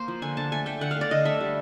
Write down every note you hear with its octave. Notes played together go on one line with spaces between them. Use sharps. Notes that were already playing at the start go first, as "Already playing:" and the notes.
Already playing: A#3 C5
F3
D3 G#5
D3 A5
A3 G#5
A3 G5
D3 F#5
F5
A3 D5
D3 D#5
A3 E5
G3